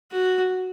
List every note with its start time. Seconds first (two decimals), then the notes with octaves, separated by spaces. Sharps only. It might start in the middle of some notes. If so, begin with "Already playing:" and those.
0.12 F#4